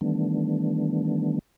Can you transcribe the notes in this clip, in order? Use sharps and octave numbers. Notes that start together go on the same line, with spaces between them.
D#3 E3 G3 A3 B3 D4